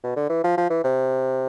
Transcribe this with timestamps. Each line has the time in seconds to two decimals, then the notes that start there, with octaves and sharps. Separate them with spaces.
0.04 B2
0.16 D3
0.29 E3
0.44 F3
0.57 F3
0.70 E3
0.84 C3